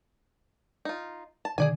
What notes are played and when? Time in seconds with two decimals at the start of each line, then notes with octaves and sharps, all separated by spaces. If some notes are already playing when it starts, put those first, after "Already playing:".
0.85 D#4 F4
1.45 A5
1.58 B2 D3 D#3 G#4 D5 G#5